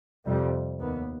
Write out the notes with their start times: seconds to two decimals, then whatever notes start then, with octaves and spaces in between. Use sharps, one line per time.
0.25 F2 C3 G3
0.79 D#2 B3